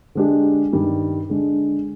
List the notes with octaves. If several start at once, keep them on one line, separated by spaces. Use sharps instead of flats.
D3 G#3 D4 G4
G2 D#3 G3
D3 G#3 D4